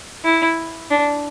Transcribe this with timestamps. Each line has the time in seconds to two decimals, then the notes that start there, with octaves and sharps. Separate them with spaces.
0.24 E4
0.90 D4